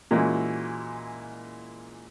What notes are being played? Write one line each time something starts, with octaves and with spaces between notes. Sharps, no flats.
A#2 E3 G#3 C#4 E4 F#4